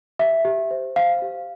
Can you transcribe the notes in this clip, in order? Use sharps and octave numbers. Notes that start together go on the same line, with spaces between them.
G4 E5
G4
C5
C5 F5
G4